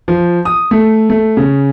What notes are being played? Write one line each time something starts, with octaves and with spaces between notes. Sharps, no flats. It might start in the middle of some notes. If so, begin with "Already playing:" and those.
F3
D#6
A3
A3
C#3